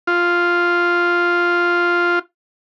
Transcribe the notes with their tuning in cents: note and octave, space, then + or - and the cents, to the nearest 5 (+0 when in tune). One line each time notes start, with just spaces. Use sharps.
F4 +0